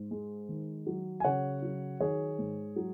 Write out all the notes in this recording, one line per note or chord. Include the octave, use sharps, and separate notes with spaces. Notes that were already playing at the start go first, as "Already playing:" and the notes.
Already playing: G#2
G#3
D#3
F#3
G#5
C#3 C#5 F#5
F#3
D#3 G#4 C#5
G#2
F#3